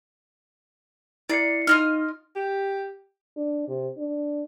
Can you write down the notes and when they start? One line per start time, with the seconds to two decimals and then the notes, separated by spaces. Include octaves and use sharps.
1.30 E4 D5 C7 C#7
1.67 D#4 F4 D#5 F6
2.35 G4
3.36 D4
3.68 C3
3.97 D4